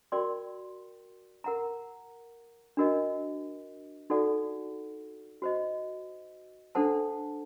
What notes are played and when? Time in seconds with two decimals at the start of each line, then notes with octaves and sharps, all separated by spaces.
0.12 F#4 A#4 D5 G5 C6
1.44 A#4 F#5 A#5
2.77 D4 F#4 A#4 D#5
4.10 D#4 F#4 A4 D5 F#5
5.42 F#4 C5 D#5
6.75 D4 A4 C5 F#5 A5